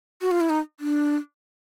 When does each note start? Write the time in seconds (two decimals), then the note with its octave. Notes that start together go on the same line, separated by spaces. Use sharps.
0.21 F#4
0.31 F4
0.41 E4
0.50 D#4
0.80 D4